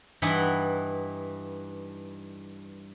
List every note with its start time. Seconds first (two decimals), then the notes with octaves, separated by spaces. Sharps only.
0.22 G2 E3 D#4 E4 B4 F#5